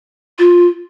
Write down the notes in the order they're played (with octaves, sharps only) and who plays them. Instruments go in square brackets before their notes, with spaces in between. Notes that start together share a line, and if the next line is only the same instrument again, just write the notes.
[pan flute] F4